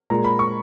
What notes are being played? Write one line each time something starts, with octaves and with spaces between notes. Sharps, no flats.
A#2 G#3 A#5
B5
C#6